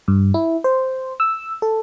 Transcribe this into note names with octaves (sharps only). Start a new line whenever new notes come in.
G2
E4
C5
E6
A4